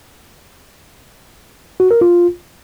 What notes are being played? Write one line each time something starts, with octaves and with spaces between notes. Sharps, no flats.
F#4
A#4
F4